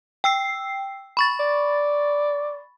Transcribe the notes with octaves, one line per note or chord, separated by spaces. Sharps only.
G5 E6 C7
B5 C#6 A6
D5